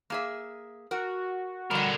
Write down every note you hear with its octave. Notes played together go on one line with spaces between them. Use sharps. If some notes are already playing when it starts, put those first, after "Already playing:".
A#3 G#4 E5
F#4 A#4
D3 G3 A#4 F#5